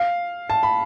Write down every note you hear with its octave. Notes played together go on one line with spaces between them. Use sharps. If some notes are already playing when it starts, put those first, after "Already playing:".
Already playing: F5
A5
B5